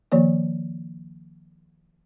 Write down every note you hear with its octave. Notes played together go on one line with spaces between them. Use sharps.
D#3 F3 A#3 C#5